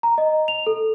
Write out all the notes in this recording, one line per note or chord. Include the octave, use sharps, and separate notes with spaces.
A#5
D#5
F7
A4